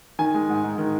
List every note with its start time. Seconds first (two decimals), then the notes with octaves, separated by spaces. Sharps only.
0.19 D#3 G#5
0.34 G#3
0.49 G#2
0.64 G#2
0.78 D#3